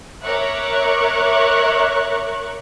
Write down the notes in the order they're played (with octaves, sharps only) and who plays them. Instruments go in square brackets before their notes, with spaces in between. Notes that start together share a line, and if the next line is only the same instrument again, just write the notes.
[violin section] A#4 C#5 E5 C#6 D6 F#6